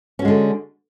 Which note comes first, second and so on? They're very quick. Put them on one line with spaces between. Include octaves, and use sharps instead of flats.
C#4 F#4 G#3 D3